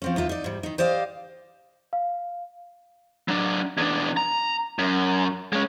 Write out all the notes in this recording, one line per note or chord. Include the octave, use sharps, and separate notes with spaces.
F3 C4 C#4
D#2 D#4 F4 E5
D#4 D5
G#2 G3
D#3 D#4
G4 C5 D5 D#5 F5
F5
F#3 D4
E2 D4
A#5
F#2
G#3 C#4